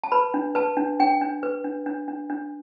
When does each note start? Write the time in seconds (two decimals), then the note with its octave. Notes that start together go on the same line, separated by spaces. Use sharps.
0.04 A5
0.12 B4 B5
0.34 D4
0.55 B4 A5
0.77 D4
1.00 D4 G5
1.21 D4
1.43 B4
1.65 D4
1.86 D4
2.08 D4
2.30 D4